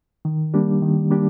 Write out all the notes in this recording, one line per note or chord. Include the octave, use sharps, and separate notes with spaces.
D#3
G3 A#3 D4 G4
D#3
G3 A#3 D4 G4